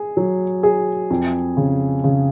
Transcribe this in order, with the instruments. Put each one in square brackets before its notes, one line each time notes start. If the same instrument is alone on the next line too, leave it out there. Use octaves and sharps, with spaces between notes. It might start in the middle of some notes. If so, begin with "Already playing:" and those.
Already playing: [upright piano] G#4
F#3
G#4
F2
C#3
C#3